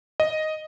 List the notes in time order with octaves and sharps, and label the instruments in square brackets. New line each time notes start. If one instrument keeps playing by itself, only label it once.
[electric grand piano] D#5